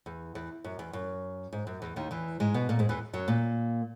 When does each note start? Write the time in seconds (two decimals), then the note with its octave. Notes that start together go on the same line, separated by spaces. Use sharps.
0.06 E2
0.35 E2
0.64 F#2
0.79 E2
0.93 F#2
1.53 G#2
1.67 F#2
1.82 E2
1.96 D#2 D#3
2.11 E2 E3
2.40 G#2 G#3
2.54 B2 B3
2.69 A#2 A#3
2.79 G#2 G#3
2.89 E2 E3
3.13 F#2 F#3
3.28 A#2 A#3